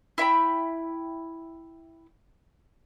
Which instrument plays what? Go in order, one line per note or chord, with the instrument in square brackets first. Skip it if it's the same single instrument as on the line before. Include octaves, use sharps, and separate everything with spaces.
[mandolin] E4 E5 G5 B5